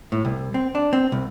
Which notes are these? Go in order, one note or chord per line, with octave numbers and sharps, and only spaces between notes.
A2
C2
C4
D4
C4
C2